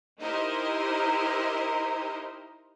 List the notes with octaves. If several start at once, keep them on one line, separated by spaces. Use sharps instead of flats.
D#4 E4 G4 A#4 C5 D#5